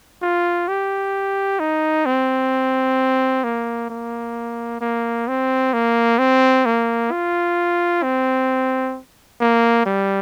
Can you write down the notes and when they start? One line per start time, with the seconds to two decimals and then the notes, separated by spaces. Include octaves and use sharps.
0.22 F4
0.68 G4
1.60 D#4
2.06 C4
3.44 A#3
3.90 A#3
4.81 A#3
5.28 C4
5.73 A#3
6.19 C4
6.65 A#3
7.11 F4
8.03 C4
9.40 A#3
9.86 G3